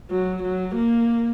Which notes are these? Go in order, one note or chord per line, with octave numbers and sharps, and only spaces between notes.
F#3
F#3
A#3